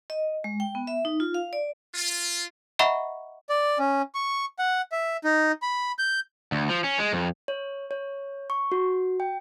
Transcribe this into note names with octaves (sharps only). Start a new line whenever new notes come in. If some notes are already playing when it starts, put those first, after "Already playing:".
D#5
G#3
G5
B3
E5
D#4
F4
F5
D5
F4
D#5 E5 F#5 A#5 B5 C#6
D5
C#4
C#6
F#5
E5
D#4
B5
G6
D2
F3
C#4
G#3
F2
C#5
C#5
C#6
F#4
G5